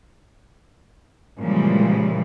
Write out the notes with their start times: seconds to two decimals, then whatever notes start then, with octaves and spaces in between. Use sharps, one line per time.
1.39 A#2 C#3 E3 F3 G3 G#3